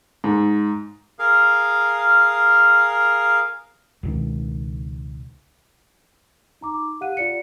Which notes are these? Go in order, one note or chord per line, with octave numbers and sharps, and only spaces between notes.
G#2
G#4 A#4 F5
C#2 B2 D#3
D#4 A#5 D6
G4 F5 F#5 F#6 D#7
F4 D5 C#7